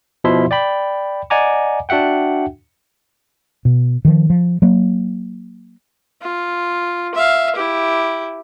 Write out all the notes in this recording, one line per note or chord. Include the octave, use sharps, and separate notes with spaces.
B2 F3 E4 E5 C6
D5 G5 B5
D5 D#5 F#5 G#5 A#5 D6
D4 F#4 E5 F#5 G5
B2
D#3 F3
F3
F#3 A#3
F4
E5 F5
E4 G4